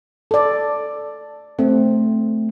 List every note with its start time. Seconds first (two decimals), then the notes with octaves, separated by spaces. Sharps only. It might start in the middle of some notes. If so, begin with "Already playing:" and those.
0.31 A4 D5
1.59 A3 C4